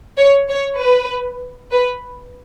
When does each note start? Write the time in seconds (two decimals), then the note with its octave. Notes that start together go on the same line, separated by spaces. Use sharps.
0.17 C#5
0.49 C#5
0.80 B4
1.71 B4